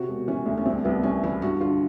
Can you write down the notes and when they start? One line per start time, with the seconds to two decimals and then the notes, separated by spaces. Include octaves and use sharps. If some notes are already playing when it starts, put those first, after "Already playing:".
Already playing: C3 F#4
0.08 E1
0.28 E3 C#4
0.46 D2
0.57 C#4
0.65 C2 C4
0.85 C2 B3
1.03 C2 C#4
1.23 E3 E4
1.42 G2 F#4
1.61 D3 F4